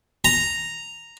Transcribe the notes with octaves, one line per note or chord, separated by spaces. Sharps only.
A#5